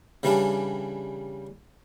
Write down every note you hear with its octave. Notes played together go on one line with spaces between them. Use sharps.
C#3 E3 G3 C#4 D4